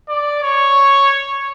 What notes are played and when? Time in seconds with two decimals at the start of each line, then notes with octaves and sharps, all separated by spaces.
0.09 D5
0.43 C#5